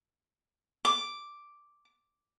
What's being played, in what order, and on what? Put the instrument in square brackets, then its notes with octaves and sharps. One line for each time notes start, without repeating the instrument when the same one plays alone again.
[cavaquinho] D6